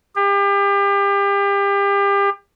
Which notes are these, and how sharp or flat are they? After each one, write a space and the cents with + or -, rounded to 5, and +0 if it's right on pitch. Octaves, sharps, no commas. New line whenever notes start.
G4 +35